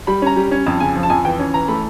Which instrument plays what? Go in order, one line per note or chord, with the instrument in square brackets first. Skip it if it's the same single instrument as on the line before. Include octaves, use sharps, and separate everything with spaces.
[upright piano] G3 B5
C#4 A#5
G3
C#4
F2 A5
C#3 G#5
F3
A5
F2 G#5
E3 G5
C#4
E3 A#5
A3 B5